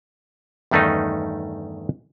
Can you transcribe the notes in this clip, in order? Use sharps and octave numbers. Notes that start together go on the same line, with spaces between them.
E2 G2 D#3 A3 C#4 D#4